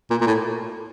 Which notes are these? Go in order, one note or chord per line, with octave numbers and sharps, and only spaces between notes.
A#2
A#2
A2